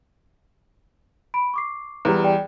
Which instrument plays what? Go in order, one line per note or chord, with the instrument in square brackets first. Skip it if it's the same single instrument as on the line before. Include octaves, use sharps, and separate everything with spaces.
[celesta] B5 D7
C#6 D6 C7
[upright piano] E2 G3 [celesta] B4 A#5
[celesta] D5 G5